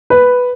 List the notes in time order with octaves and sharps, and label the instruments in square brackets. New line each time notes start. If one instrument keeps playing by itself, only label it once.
[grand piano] B4